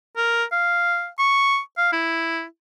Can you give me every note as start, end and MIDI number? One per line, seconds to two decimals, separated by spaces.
0.17 0.44 70
0.52 1.08 77
1.19 1.59 85
1.78 1.91 77
1.93 2.44 64